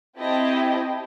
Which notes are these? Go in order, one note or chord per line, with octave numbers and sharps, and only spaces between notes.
C4 E4 G4 D#5 G5 A5